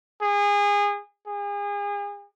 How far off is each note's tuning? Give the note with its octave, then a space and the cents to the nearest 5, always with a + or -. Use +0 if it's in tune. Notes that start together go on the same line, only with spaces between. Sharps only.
G#4 -25
G#4 -35